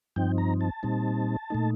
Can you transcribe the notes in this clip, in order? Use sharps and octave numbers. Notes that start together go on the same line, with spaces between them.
G2 F3 C4 D#4 G5
A#5
A5
A#2 G3 C4 D#4
A#2 A3 D#4